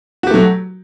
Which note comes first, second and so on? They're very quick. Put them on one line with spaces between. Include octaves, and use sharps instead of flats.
F#4 G4 A3 F#3